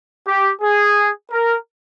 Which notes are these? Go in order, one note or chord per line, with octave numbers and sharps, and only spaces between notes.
G4
G#4
A#4